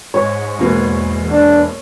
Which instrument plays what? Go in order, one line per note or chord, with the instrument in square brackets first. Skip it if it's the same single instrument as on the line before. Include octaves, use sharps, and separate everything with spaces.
[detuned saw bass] G#2 [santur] C#5
[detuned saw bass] E2 [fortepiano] G#2 B2 A#3
[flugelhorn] D4